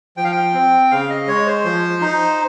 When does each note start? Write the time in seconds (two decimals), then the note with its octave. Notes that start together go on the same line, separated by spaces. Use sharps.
0.17 F3 G5
0.24 F5
0.32 G5
0.54 C4
0.91 C#3 F5
1.10 D#5
1.27 G#3 C#5
1.47 C5
1.65 F3
2.02 D#4